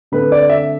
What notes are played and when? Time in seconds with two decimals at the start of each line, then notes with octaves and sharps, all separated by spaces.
0.12 D3 A3 C4 B4
0.32 D5
0.49 E5